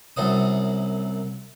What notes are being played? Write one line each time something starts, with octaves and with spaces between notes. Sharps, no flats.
C2 F#2 F#3 D#6